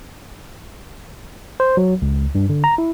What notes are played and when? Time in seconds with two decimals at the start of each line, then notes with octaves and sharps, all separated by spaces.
1.60 C5
1.77 F#3
2.02 C#2
2.35 G2
2.49 D3
2.64 A#5
2.78 E4